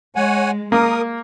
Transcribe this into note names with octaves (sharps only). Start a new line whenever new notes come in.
G#3 C#5 F#5 G#5
A#3 A#4 D#6